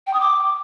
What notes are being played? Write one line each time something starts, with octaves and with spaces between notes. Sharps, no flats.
G5
D#6
D6